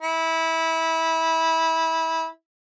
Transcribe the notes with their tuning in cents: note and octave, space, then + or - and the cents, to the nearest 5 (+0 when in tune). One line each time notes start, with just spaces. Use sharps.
E4 -20